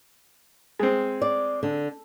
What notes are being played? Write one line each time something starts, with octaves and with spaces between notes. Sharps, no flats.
G#3 C4
D5
D3